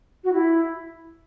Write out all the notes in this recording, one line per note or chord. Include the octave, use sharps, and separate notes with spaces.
F#4
E4